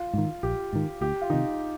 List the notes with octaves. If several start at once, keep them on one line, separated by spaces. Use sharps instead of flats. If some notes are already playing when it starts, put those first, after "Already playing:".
Already playing: F4
G#2 D#3
A#1 G4
G#2 D#3
D2 G4
F4
C3 D#3 D#4